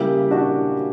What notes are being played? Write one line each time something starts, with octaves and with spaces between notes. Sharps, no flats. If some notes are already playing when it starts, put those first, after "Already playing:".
Already playing: C#3 G3 A#3 E4 G4
D4 F#4